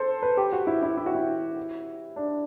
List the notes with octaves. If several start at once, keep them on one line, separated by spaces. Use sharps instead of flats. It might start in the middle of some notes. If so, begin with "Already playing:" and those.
Already playing: A4 C5
B4
G4
F#4
E4
E4
E4
F#4
E4
D4